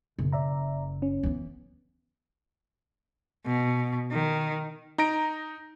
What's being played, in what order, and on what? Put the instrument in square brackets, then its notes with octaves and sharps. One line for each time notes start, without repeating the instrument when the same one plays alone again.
[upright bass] F#1 [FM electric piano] B2
[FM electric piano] D5 E5 A#5
C#4
[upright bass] E3 B3
[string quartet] B2
D#3
[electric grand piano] D#4 A#5 A#6 D7